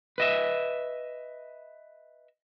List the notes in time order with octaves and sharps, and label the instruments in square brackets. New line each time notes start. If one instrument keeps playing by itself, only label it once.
[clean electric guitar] B4 D#5 E5